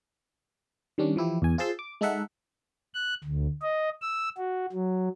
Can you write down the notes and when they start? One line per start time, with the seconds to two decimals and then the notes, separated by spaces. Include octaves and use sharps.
0.98 D#3 G3 C#4 D4
1.16 E3 F3 E4 G4
1.42 E2 G#5
1.58 F4 G#4 C5 A5 C6 E6
1.79 D6
2.01 G#3 D#4 A4 E5 F#5
2.94 F#6
3.24 D2
3.62 D#5
4.02 E6
4.38 F#4
4.72 F#3